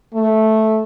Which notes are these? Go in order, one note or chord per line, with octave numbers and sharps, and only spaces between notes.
A3